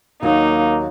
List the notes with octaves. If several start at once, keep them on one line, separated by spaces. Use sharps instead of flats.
D#2 F#3 A#3 D#4